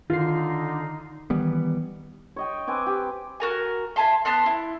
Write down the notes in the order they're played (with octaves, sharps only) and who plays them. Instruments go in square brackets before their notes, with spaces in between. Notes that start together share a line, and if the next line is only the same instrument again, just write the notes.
[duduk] D3 [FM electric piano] D#3 C7 [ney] D#4 [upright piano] F4
[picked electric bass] D#3 E3 G3 B3
[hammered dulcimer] C#5 D#5 G5
C4 B4 G#5 D6
G4
[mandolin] F#4 A#4 G#5
E5 G#5 A5 C6
B3 A5 C6 F#6
E4